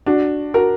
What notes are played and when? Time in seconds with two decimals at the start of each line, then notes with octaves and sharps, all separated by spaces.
0.06 D4 F#4
0.54 F#4 A#4